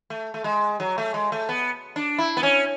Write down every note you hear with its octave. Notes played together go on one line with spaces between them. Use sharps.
A3
A3
G#3
F#3
A3
G#3
A3
B3
D4
E4
B3
C#4